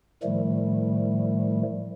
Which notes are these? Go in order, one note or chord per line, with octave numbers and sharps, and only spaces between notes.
A2 D#3 F3 G3 A3